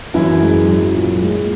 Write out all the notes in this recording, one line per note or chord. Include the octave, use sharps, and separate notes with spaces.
F#2 E3 E4
G#3
F#2
A#2
G#3